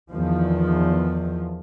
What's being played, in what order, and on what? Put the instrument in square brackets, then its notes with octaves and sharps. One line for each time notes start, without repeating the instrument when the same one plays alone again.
[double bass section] E2 D#3 F3